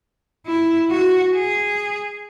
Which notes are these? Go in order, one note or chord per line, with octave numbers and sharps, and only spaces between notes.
E4
F#4
G#4